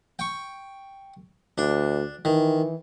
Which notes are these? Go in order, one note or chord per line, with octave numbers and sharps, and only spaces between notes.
G5 C#6
D2 D4
D#3 E3